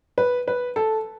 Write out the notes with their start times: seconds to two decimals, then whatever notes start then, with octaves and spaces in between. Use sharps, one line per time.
0.18 B4
0.48 B4
0.76 A4